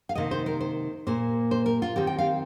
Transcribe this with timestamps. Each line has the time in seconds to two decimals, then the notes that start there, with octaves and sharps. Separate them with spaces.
0.09 F5
0.15 C3 D#3 A#3 D#5
0.31 C5
0.46 A#4
0.60 C5
1.07 A#2 A#3 C5
1.51 C5
1.66 A#4
1.82 F4
1.96 D#3 C4 G4
2.07 G5
2.18 F5